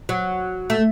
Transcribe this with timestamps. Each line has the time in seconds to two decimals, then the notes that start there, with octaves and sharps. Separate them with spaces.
0.09 F#3
0.70 A3